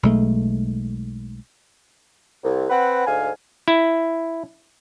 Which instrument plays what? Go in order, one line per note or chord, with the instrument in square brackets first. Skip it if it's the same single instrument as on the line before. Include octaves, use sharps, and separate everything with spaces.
[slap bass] B1 G#3 A3
[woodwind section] C2
C4 B4 F#5
D2 G#2 F5 G#5
[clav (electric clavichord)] E4